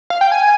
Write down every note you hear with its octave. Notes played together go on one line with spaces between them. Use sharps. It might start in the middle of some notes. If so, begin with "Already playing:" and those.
F5
G5
G#5